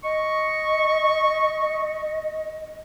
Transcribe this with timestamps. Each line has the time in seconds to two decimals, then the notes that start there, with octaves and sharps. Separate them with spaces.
0.04 D#5 C#6